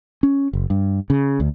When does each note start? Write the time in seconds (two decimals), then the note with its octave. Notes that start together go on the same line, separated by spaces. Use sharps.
0.23 C#4
0.53 F#1
0.70 G2
1.10 C#3
1.40 D2